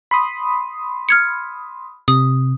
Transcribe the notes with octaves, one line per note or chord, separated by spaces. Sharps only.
B5 C6 D#6
F6 G#6 C#7
C3 D#6